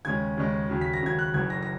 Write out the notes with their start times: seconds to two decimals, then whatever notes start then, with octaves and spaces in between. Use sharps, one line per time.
0.05 D#2 C#3 G#3 C#4 G#6
0.37 D#2 C#3 G#3 C#4
0.69 D#2 C#3 F#3
0.81 B6
0.93 A#6
1.02 D#2 C#3 F#3 G#6
1.19 F#6
1.34 F#1 F#2 D#3 G#6
1.50 A#6
1.63 A#6